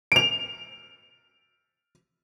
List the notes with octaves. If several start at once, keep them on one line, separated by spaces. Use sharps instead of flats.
D7 F7